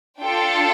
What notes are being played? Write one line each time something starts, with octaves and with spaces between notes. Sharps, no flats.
D4 F4 A4 G5